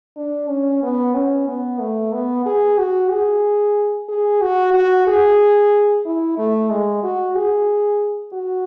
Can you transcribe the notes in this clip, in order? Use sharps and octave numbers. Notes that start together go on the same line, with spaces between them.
D4
C#4
B3
C#4
B3
A3
B3
G#4
F#4
G#4
G#4
F#4
F#4
G#4
E4
A3
G#3
F#4
G#4
F#4